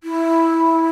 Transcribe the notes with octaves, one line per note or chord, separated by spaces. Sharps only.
E4